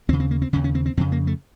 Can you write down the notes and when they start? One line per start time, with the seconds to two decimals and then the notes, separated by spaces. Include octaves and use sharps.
0.09 D#2 C4
0.13 C#3
0.20 C4
0.31 A#3
0.42 C4
0.53 D#2 C#3 C#4
0.64 C#4
0.75 C4
0.86 C4
0.97 F2 C4
1.00 C#3
1.12 A#3
1.27 A3